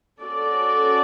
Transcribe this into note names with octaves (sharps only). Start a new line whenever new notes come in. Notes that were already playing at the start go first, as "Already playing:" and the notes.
C#4 F#4 A4 D5